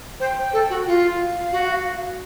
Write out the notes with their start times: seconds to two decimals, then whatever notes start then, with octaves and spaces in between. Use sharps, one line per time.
0.20 C5 G5
0.53 A4
0.70 F#4
0.87 F4 F5
1.52 F#4